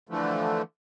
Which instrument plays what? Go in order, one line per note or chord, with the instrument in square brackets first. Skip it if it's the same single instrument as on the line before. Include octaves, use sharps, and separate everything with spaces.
[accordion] D3 E3 F3 A3